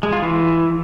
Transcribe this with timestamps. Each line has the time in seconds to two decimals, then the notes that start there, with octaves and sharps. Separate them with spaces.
0.03 G#3
0.13 F4
0.22 E3